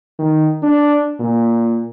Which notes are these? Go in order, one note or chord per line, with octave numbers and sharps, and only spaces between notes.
D#3
D4
A#2